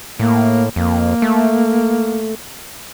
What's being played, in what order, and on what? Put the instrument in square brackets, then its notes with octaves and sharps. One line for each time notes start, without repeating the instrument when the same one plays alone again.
[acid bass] A2 [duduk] A#3
[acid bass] F2 [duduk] A#3
[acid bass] A3